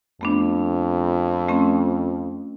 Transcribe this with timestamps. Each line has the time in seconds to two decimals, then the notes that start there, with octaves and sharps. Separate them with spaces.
0.21 F2 A3 B3 D4
1.49 A3 C4 C#4